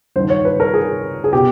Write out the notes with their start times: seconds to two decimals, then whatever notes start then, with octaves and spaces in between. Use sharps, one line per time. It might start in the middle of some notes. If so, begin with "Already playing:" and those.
0.16 G2 D#3 C5
0.30 C#5
0.45 B4
0.60 A#4
0.74 G#4
1.24 G#4
1.33 B2 G4